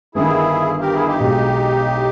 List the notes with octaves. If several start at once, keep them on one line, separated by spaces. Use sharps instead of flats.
G1 G2 D#3 E4 G#4
G4 A#4
E4 G#4
D#4 G4
B1 B2 G#3